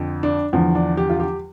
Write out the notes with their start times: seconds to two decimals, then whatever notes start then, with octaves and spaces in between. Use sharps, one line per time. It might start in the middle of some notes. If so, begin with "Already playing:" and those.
Already playing: F2 D3 F3
0.23 D4
0.53 E2 D3 F3
0.75 D4
0.97 G4
1.10 F4
1.20 G4